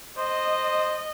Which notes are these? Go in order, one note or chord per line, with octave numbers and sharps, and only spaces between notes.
C5 D#5